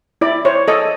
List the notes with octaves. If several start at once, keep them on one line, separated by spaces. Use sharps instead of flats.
E4 D5
C5 C#5
A4 D#5